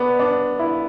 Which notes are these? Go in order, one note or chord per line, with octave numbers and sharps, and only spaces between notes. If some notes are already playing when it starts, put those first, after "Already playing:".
Already playing: B3 D4
D4
E4